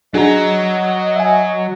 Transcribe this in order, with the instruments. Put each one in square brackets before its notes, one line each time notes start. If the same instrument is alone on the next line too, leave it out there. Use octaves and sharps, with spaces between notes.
[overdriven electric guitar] F#3 A#5 [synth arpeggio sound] D4 F#4 G#4 [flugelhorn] D#5
[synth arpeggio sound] E5 G#5